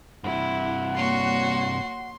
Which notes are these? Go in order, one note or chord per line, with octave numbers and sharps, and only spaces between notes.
G2 C3 E4 F#5
A#3 F#4 C#5 C6